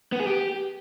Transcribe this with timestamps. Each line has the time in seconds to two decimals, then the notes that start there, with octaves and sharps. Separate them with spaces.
0.12 B3
0.20 G#4
0.27 G4